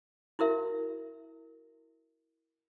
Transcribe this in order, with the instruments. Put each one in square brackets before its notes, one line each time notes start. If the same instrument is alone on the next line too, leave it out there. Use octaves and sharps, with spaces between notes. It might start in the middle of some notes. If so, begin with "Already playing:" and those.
[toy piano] E4 F#4 A#4 E5